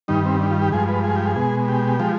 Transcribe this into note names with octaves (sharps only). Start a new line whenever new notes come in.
G2 D#3 G3 D#4
C4
D4
F4
G4
G2 F3 G#3 G#4
B4
G#4
G4
G#4
B2 G#3
G4
F3 G#3